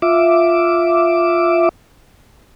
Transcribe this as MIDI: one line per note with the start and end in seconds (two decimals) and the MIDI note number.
0.02 1.69 65
0.02 1.69 76
0.02 1.69 86